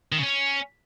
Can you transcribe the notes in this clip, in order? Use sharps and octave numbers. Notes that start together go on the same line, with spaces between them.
D#3
C#3
C#4